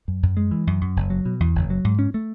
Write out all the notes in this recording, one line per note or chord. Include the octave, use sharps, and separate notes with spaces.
F#2
F#2
G#3
E3
F#2
F#2
F#1
F#3
B2
E2
F#1
F#3
G#2
C#4
A3